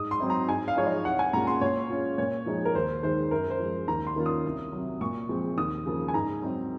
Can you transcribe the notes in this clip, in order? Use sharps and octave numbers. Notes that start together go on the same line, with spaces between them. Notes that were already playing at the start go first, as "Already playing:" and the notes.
Already playing: G#2 D#6
C6
F#3 C4 D#4
A#5
G#2 G#5
F5
F3 G#3 D#4 C#5
D#5
C2 F#5
G#5
A#2 G#3 C#4 F4 A#5
C6
A#2 C#5
G#3 C#4 F4
A#2 C#5
F3 G#3 D#4
A#4
D#2 C5
D#3 G#3 C5
F#2 A#4
C5
F3 G#3
D#2 A#5
C6
D#3 A#3 C#4 F4
D#6
C2
C3 F#3
A#2 C#6
F3 G#3 C4
D#2 D#6
C#3 F3 A#3
G#5
G#2 A#5
F#3 C4 D#4